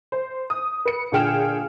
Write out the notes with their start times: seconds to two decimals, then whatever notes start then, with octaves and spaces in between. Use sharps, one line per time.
0.12 C5
0.50 D#6
0.85 B4 C#7
1.12 A#2 D3 G#4 G5 F6 E7